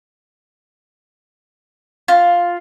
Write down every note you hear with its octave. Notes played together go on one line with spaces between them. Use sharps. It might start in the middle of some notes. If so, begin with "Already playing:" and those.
F4